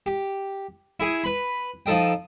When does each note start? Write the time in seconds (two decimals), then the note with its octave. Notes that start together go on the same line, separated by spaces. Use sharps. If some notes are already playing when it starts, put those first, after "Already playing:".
0.06 G4
1.00 E4 G#4
1.24 B4 B5
1.86 F3 D#4 A4 D#5 G5